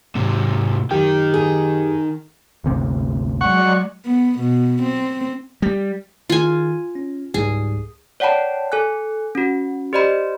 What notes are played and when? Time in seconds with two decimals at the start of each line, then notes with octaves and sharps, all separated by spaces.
0.15 G#2 C3
0.91 F#2 D#3 G4 G5
1.34 G#4
2.64 G1 D2 C3
3.41 F#3 G#3 D5 F#5 C#6
4.05 B3
4.39 B2
4.81 C4
5.62 G3
6.30 D#3 F4 G#4 G#5
6.95 C#4
7.34 C#2 G#2 G3 G#4
8.20 C#5 D5 F#5 G5 A5 B5
8.72 A4 G#5 F#6
9.35 C#4 F#4
9.93 G4 C5 D5 D#5 B5